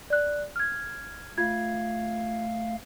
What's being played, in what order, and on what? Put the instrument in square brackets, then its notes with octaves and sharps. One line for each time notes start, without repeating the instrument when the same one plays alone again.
[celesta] D5 F#6
F6 G#6
[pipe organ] A3 F5 [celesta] F4 G#6